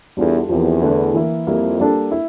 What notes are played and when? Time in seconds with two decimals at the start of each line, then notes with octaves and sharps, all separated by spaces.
0.17 E2 G3 D4 F4 A4
0.49 E2 F3 C4 G4 A#4
0.82 D3 A3 D4
1.14 E3 A#3 E4 A#4
1.47 F2 G3 A#3 E4
1.79 G3 A#3 D4 A4
2.12 E4